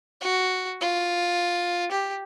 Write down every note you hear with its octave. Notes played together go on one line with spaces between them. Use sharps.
F#4
F4
G4